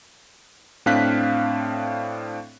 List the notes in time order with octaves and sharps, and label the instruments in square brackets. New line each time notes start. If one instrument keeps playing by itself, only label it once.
[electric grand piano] A2 C4 D4 F5 F#6 B6